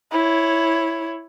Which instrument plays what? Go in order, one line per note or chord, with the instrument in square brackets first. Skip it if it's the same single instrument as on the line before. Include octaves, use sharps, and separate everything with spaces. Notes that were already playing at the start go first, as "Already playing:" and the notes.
[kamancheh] E4 C#5